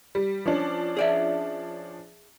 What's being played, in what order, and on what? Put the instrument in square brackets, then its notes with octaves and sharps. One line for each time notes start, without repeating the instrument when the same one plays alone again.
[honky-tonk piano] G3
F3 C#4 D4
[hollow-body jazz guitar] G#4 D5 E5